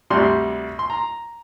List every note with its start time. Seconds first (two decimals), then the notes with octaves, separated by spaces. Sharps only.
0.10 D2 C3 G3 C6
0.79 C6
0.90 A#5